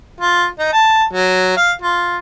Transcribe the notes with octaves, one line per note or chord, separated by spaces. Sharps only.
F4
D#4
A5
F#3
F5
F4